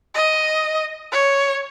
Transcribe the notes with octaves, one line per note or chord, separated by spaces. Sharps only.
D#5
C#5